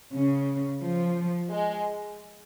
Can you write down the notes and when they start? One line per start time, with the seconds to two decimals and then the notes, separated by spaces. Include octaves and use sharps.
0.13 C#3
0.82 F3
1.51 G#3